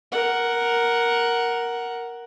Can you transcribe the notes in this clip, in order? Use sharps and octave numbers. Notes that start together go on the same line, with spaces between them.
A#4 F#5